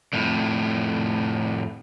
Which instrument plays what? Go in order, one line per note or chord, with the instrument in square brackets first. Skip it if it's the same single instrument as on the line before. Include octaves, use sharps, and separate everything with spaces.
[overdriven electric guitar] F2 A2